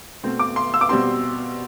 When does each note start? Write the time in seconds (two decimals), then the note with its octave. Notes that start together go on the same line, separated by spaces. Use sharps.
0.23 B2 A3 C4
0.39 D6
0.56 C6
0.74 E6
0.81 D6
0.89 B2 G3 C4 C6